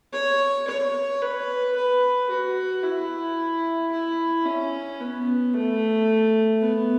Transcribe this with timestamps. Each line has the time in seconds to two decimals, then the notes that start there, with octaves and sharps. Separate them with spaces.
0.13 C#5
0.67 C#5
1.21 B4
1.75 B4
2.29 F#4
2.83 E4
3.91 E4
4.45 C#4
5.00 B3
5.53 A3
6.61 B3